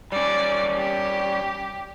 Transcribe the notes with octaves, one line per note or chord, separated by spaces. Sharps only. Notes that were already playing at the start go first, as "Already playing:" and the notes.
G3 C#4 D5
G4